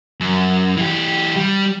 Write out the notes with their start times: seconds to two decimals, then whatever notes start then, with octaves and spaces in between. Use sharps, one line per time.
0.20 F#2
0.77 E3 G4
1.36 G3